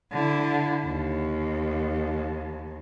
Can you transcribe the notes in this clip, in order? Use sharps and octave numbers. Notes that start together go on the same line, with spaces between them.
D3 E4
D#2